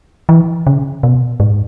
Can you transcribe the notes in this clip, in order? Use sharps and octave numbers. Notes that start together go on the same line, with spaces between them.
E3
C#3
B2
G#2